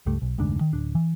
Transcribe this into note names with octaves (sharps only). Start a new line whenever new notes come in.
C#2 G2 G3 A3
B1
F1 D2 G#2 D4
D#3
D1 D4
E3